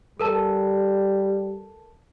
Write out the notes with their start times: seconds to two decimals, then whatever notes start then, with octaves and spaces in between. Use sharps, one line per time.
0.20 G3 A4 A#4 A5